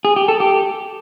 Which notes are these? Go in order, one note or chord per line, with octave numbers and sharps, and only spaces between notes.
G#4
G4
A4
G4